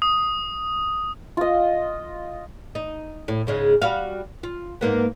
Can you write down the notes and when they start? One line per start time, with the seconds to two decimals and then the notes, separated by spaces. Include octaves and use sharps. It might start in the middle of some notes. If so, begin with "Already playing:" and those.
0.02 D#6
1.37 F4 D#5
2.75 D#4
3.28 A2
3.47 G#2 C#3 G#3
3.82 G3 F#4 F5
4.43 F4
4.81 G#2 A#3 B3